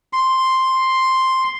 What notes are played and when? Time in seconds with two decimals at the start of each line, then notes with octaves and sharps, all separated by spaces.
0.13 C6